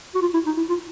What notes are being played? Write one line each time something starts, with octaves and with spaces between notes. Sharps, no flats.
F#4
F4
E4
D#4
E4
F4